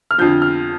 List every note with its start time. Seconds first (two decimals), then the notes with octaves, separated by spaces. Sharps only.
0.11 F6
0.18 F2 D3 F3 G6
0.42 F6